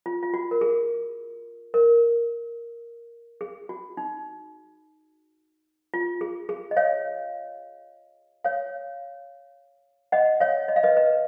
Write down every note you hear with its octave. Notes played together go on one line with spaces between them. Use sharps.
F4
F4
F#4
A#4
G#4
A#4
G#4
F#4
D#4
F4
G#4
G#4
D#5
C#5 F5
C#5 F5
D#5 F#5
C#5 F5
D#5
F5
B4 D#5
B4 D#5